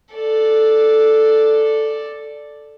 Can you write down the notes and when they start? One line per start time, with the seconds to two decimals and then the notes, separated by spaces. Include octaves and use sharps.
0.14 A4 D5